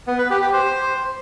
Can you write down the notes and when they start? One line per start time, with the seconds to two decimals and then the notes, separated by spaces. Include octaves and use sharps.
0.07 B3
0.19 B4
0.30 G4
0.41 G4
0.53 C5